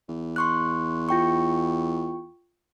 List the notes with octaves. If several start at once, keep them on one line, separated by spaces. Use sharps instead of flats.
E2
C6 C#6 F#6
F4 G5 C#6